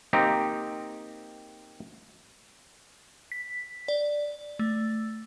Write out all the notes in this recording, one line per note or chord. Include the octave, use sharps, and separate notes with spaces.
A#3 C4 D#4 G4
B6
D5
A3